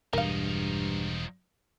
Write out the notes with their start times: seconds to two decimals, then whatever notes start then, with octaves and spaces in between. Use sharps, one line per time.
0.13 E1 G2 F3 D#4 A#4 F5